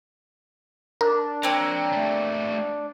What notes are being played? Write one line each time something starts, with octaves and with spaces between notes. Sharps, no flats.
D4 A#4
A#3 C4 C#5 A#5
G3 A3